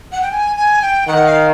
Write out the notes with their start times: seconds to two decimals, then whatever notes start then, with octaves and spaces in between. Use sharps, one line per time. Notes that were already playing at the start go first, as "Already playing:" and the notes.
0.12 F#5
0.22 G5
0.32 G#5
0.56 G#5
0.82 G5
1.07 D#3 F#5
1.26 F5